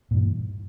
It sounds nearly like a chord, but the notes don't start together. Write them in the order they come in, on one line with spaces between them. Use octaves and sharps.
A#2 G2 E3